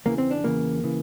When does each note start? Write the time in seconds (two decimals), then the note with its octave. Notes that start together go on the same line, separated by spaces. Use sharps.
0.06 E2 C#3 E3 A#3
0.18 C4
0.31 D4
0.44 E2 C#3 E3 A#3
0.83 C#3 E3